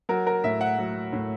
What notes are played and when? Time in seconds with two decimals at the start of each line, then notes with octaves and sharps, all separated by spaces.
0.09 F#3 A#4
0.27 A#4
0.44 A2 E5
0.61 F#5
0.78 F#3
1.13 A2